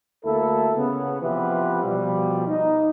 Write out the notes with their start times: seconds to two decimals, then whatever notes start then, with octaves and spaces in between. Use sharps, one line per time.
0.25 D2 A#3 E4 A4
0.76 C#3 B3
1.22 C3 E3 F3 B3 G4 B4
1.83 B2 F3 G3
2.48 D#4